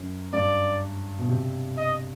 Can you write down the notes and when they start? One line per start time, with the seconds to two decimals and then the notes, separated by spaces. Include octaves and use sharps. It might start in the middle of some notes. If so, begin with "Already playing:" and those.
Already playing: F#2
0.33 G2 D5
1.18 B2
1.29 C3
1.77 D#5